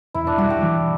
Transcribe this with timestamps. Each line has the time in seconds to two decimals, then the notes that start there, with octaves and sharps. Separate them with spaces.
0.14 E2 E4
0.27 D4
0.38 G3 F#4
0.50 G4
0.63 E3